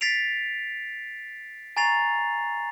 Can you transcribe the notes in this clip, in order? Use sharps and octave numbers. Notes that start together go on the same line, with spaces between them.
A6 B6 C7 D7 F7
G#5 A#5 C#6 A6 C7 F7